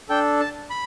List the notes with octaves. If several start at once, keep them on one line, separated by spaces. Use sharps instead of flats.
D4 A4 G5
A5
B5